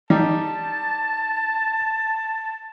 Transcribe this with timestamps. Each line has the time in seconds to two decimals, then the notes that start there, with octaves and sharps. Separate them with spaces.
0.10 G3 D#4 A5